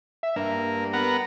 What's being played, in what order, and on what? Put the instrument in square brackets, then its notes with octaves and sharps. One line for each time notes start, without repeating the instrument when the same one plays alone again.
[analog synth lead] E5
[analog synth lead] G2 [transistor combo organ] A#3
[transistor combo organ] B3 A#4 F#5